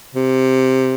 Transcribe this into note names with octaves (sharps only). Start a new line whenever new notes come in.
C3